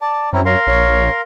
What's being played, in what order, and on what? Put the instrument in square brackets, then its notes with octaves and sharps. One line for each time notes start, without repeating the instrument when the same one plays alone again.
[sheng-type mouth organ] D5 [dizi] A5
[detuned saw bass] F#2 [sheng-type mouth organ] C4 C#4 E4 [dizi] A#5
[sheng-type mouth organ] A#4 F5 C6 [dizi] C#5
[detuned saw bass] A#1 [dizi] C#5